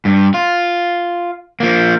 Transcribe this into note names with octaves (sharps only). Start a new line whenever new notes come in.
G2
F4
F3 A#3